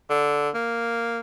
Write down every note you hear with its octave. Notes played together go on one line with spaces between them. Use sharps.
D3
A#3